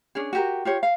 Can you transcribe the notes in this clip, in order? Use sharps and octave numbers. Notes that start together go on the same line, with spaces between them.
C#4 D4 G#4
F#4 G4 A#4
F4 G4 C#5
F5